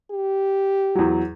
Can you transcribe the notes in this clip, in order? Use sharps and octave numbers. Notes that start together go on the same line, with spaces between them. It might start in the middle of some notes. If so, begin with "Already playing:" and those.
G4
E2 F#3